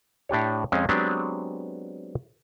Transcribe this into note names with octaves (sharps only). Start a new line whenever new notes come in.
A2 D4 G4 C#5
F2 G#3 C4 C#4
F#3 G#3 B3 C4 D4 G4